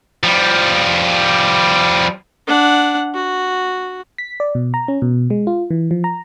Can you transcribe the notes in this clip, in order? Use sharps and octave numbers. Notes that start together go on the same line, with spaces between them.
F3 G3
D4 F#5
F#4
B6
D5
B2
A#5
C#4
B2
G#3
F4
E3
F3
A#5